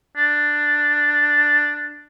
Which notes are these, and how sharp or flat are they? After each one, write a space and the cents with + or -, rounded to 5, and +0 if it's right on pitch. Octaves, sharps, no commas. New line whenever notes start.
D4 +5